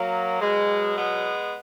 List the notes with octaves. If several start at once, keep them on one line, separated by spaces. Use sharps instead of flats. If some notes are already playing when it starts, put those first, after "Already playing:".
Already playing: F#3 A#3
B2 F#3 G#3
G#3 B3